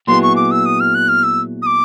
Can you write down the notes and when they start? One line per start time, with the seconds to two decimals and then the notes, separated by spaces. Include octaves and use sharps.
0.07 A#2 F#3 B3 E4 G#4 C6
0.23 C#6
0.36 D6
0.51 E6
0.66 D#6
0.80 F6
0.95 F#6
1.08 F6
1.23 E6
1.62 D#6
1.66 D6